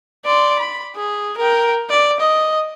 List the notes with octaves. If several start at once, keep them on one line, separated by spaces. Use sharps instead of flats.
D5 C6
B5
G#4
A#4 G5
D5
D#5